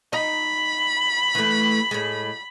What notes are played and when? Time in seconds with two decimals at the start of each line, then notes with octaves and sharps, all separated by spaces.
0.13 D#4 B5
1.35 E3 A3
1.91 A2 G#3